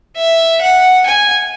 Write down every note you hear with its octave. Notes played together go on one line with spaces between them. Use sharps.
E5
F#5
G#5